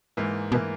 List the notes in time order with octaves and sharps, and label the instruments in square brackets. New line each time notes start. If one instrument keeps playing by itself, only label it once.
[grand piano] G#2 E3 A#3
[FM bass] B2 [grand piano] E3 A#3